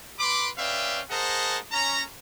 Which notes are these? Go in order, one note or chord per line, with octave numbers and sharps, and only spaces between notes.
B4 B5 C6 D6
C#4 B4 D5 E5 F5 G5
G#4 A#4 C5 D#5 F#5 A5
C#4 A#5